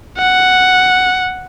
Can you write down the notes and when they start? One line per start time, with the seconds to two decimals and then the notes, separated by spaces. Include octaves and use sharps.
0.18 F#5